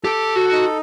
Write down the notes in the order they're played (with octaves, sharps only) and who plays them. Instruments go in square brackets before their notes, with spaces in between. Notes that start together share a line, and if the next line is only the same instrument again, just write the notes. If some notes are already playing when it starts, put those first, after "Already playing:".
[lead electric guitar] G4 [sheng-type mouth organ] A4
[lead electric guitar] F#4
[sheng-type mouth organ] D#4